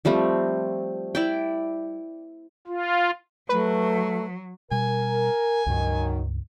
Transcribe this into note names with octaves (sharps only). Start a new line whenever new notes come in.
F3 G3 A3 C4
E4 D5 G5
F4
F#3 A3 B4
B2 G3 A#4 G#5
C#2 G2 D#3 F#3